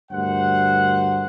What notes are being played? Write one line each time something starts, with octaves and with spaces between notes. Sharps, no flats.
D2 G2 A#4 C5 F#5